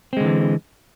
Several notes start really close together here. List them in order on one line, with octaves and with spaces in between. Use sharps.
C4 G#3 D3 E3